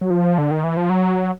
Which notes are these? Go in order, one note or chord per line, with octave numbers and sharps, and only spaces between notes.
F#3
F3
D3
D#3
E3
F3
F#3